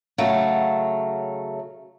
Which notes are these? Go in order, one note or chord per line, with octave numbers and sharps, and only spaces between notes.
C#3 F#3 A3